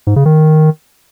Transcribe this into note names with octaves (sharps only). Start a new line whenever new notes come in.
G#2
C#3
D#3